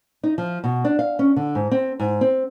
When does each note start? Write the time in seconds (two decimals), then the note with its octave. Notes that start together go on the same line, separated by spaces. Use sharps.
0.23 D#4
0.38 F3
0.64 B2
0.85 D4
0.99 F5
1.19 C#4
1.36 D3
1.55 G#2
1.71 C4
2.00 G#2
2.21 C4